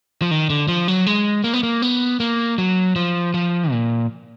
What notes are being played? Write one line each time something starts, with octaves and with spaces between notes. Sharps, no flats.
F3
D#3
D3
F3
F#3
G#3
A#3
B3
A#3
B3
A#3
F#3
F3
F3
A#2